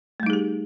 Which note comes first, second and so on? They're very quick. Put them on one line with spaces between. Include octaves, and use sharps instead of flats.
A3 G3 D#4 G#4 G4